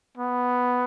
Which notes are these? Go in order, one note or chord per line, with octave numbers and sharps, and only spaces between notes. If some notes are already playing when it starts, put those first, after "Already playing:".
B3